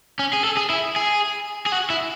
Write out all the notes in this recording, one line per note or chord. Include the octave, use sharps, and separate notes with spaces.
C#4
G#4
A4
G#4
E4
G#4
G#4
F#4
E4